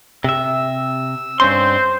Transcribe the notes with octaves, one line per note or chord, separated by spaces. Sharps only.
C3 E5 E6
G2 C4 C#4 C5 C6